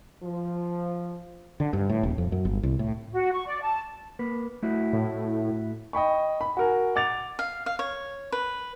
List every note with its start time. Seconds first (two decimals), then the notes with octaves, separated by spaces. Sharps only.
0.23 F3
1.60 D3
1.73 G2
1.90 A2
2.03 D#1
2.18 F2
2.32 F#2
2.45 G1
2.63 C2
2.79 A2
3.12 F#4
3.32 C#6
3.46 D5
3.62 A5
4.19 A#3 B4
4.63 A3 E4 F#4
4.93 A2
5.93 D#5 G5 B5 C#6
6.41 B5
6.57 F#4 A#4 G#5
6.96 F#5 D6 A6 F7
7.39 F5
7.66 F5
7.79 C#5
8.32 B4